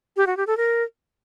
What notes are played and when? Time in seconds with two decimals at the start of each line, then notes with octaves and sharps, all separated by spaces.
0.17 G4
0.27 F#4
0.37 G4
0.47 A4
0.57 A#4